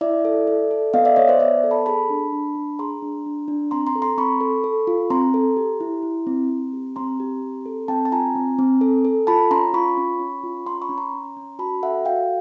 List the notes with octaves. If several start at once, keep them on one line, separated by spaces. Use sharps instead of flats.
E4 D5 E5
A4
A4
A4
B3 D#5 F5
D5 E5
B3 C#5 D#5
C5 D5
B3 D5 E5
A4
A5 B5
G#4 A5 B5
D4
D4
D4
G#4 A#5 C6
D4
D4
D4
C4 A#5 C6
A#5 C6
A4
A#5 C6
C4 B5 C#6
A4
A4
F4
C4 A#5 C6
A4
G4
E4
E4
C4
C4
G4
C4 A#5 C6
G4
C4
A4
C4 G5 A5
A5
F4 G#5 A#5
C4
C4
A4
A4
F4 A5 B5
C#4 A#5 C6
F4 B5 C#6
C#4
C#4
F4
C#4 A#5 C6
B5 C#6
C#4
A#5 C6
C#4
C#4
F#4 A5 B5
A4 E5 F#5
F#4 F5 G5